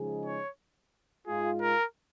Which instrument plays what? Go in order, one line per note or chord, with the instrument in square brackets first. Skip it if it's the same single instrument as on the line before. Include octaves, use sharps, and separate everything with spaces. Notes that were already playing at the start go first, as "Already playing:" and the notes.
Already playing: [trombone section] C#3 F3 G#3 D#4 G#4
[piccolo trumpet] C#5
[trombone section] G#2 G#3 F4 [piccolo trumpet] G#4
[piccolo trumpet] A#4